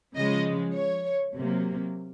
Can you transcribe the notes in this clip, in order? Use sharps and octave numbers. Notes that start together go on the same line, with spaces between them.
C#3 F3 G#3 D#5
C#5
C3 F#3 A#3